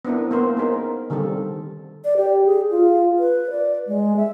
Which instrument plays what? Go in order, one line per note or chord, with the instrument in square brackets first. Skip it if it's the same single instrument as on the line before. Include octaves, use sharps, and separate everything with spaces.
[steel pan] B3 C4 D4 E4 A#4
A#3 B3 C5
C#4 D#4 G#4 A#4 C5
D3 D#3 G3 C4 A4
[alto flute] D5
G4
G#4
F4
B4
D5
G#3
E5